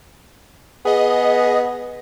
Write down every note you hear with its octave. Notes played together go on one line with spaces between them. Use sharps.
B3 G#4 D#5